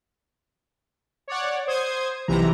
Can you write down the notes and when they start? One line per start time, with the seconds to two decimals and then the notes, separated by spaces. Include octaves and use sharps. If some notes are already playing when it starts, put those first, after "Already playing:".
1.28 C#5 D5 F#5
1.67 C5 D#6 G#6
2.28 B1 C3 E3 A#5